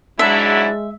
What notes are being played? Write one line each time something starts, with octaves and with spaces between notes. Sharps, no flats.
G#2 F#3 G#3 D4 E4 E5 A5